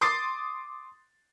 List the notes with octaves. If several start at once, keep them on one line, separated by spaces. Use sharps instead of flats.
C6 D6 D#6 A6 C7